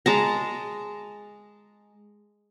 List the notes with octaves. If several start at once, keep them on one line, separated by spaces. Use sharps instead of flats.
G#3 A5 A#5